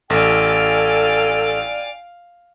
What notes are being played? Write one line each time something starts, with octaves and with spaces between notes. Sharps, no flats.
A1 A4 D5 F5 G5 G#5